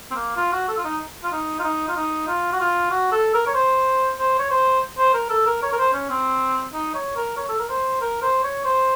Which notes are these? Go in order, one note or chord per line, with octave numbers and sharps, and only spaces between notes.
C4
A#3
F4
F#4
A4
F4
D#4
F4
D#4
F4
D#4
F4
D#4
F4
F#4
F4
F#4
A4
A#4
C#5
C5
C5
C#5
C5
C5
A#4
A4
A#4
C#5
A#4
C5
C#4
C4
D#4
C#5
A#4
C#5
A4
A#4
C5
A#4
C5
C#5
C5